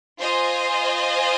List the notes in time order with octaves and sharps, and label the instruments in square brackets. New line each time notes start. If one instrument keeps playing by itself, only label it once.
[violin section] F4 C5 D#5 G#5